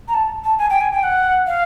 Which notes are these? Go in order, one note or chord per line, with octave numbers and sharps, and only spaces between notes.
A#5
A5
A5
G#5
G5
G#5
G5
F#5
F5